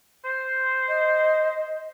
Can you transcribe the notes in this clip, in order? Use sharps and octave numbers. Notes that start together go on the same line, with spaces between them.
C5
D#5